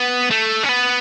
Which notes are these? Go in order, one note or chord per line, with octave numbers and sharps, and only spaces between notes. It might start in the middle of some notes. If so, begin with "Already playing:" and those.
Already playing: B3
A3
C#4
B3